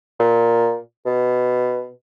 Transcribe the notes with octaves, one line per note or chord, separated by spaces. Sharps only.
A#2
B2